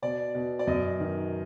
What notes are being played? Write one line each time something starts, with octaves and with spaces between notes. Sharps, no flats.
B2 D5
B2
D5
F#2 D#5
D#3